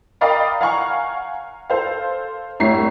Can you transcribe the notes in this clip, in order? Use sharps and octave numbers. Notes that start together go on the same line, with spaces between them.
A#4 D5 D#5 F5 G5 B5
F5 F#5 G#5 A#5 C#6 F6
A4 C5 F5
C2 A2 E4 C#5 A#5 C7